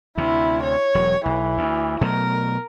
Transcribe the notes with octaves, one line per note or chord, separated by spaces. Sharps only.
D2 C3 E4
C#5
E1 F#3
B1 E3
D2
B2 F#3 A3 A#4